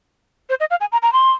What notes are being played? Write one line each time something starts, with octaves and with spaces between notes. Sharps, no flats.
C5
D#5
F5
G#5
A#5
A#5
C6